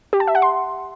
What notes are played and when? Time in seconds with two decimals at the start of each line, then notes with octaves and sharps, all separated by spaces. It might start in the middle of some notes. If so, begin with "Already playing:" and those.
0.13 G4
0.20 A5
0.27 E5
0.35 F#5
0.42 C6